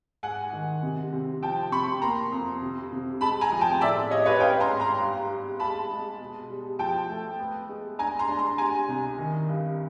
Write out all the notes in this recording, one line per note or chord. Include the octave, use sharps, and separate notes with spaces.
G#2 F#5 G#5
D#3
C3
C3
F3 G5 A5
C3 B5 C#6
A#3 A#5 C6
F2
C3
C3
G#3 A5 B5
G#5 A#5
F3
G5 A5
A2 D5 E5
G3 C#5 D#5
B4 C#5
C#4 F5 G5
A#5 C6
G#2
A#5 C6
G2
G3
G#3 A5 B5
G#3
B2
G3
F3 G5 A5
A3
B3
G#3
D4 G#5 A#5
A#5 C6
D4
A#5 C6
G3 G#5 A#5
C2
D#3
G2